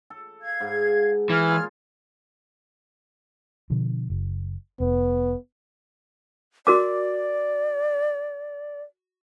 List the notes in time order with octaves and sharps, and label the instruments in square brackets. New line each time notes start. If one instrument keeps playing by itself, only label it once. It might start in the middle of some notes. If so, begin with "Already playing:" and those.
[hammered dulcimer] A4
[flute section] F5 G#6
[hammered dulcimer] G#2
[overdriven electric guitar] E3 [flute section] F6 G#6
[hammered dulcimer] A#2 F4 G#4
[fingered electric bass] B2 D3 F3
F#1
[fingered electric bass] F1 [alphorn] B3
[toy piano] F#4 A#4 D6 [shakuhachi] D5